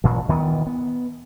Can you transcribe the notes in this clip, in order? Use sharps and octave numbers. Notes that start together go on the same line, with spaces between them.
A1 A#2 E3
D2 D#3 E3 B3
B3